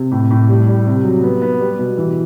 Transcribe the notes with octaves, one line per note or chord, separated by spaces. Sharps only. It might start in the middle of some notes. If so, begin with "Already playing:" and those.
Already playing: C3
A2
A2
G3
G3
C3
F#3
B3
B3
G3
B2
E3